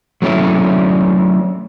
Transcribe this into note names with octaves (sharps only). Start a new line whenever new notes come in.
F#3 A3 C#4 E4